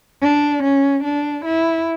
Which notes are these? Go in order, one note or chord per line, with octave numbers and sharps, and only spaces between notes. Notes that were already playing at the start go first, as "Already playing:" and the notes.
D4
C#4
D4
E4